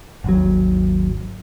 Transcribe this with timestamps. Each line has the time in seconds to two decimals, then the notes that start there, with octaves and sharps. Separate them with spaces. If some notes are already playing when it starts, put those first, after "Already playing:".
0.24 G#1 D#2 F#3